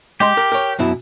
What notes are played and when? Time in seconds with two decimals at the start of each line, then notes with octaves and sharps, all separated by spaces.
0.20 G#3 G4 D#5 C6
0.37 A#4
0.52 A#4 C#5
0.79 F#2 B2 E4